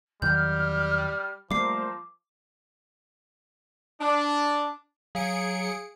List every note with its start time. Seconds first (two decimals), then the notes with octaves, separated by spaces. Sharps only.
0.22 E2 D#3 F#3 G3 F6 G6
1.51 F3 G3 A3 A#3 A#4 C5 D6 C7
4.01 D4
5.15 F#3 G#4 F5 C#7 D7